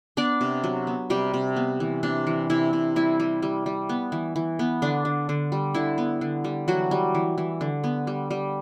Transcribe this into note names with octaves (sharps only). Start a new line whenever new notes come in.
B3 D4 D5
C3
F#3
B3
C3 G3 G4
C3
B3
E3
C3 D4
E3
C3 E4
C3
G3 E4
G3
G3
G3
B3
E3
E3
B3
D3 D4
D3
D3
G3
D3 E4
B3
D3
G3
E3 F#3 F#4
G3
E3
E3
D3
B3
G3
G3